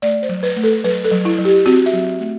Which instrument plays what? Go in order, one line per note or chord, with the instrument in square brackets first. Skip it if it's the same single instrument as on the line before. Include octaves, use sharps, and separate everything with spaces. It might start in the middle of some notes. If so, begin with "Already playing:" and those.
[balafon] A3 D5
C5
F#3
B4
A3
A4
F#3 B4
A4
F#3
E4
F#3
G4
C4 F#4
E5
F#3
A3